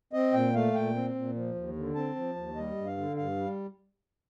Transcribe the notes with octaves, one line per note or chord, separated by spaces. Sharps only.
C4 D#5
A#2 G5
A3 F5
A#2 G5
C4
A#2
F3
D#2
D3
C4 A5
F3
D#2
G3 D#5
G2
F5
D3
G2 F5
G3